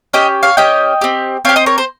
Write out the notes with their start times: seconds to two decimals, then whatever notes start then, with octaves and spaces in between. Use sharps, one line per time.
0.13 C#4 G4 D#5 G5
0.43 C#5 F5
0.57 C#4 G4 D#5 G5
1.01 C4 G4
1.45 C4 G4 C#5 F5
1.56 C5 D#5
1.66 A#4 C#5
1.78 C5